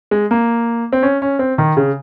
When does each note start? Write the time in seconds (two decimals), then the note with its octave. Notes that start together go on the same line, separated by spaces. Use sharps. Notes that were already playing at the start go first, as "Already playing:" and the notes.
0.11 G#3
0.31 A#3
0.92 C4
1.03 C#4
1.22 C#4
1.39 C4
1.58 D#3
1.77 C#3